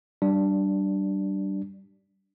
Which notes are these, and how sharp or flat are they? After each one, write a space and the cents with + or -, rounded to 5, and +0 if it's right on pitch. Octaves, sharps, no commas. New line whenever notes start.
G3 -20 D4 +0